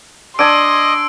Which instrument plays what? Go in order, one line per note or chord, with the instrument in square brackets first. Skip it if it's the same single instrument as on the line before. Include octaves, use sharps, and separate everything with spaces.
[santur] D4 G#5 [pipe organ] D#5 [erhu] C6 [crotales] E6 D7